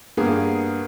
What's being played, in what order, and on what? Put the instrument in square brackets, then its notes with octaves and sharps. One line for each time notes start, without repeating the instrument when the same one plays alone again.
[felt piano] G2 A#3 B3 G#4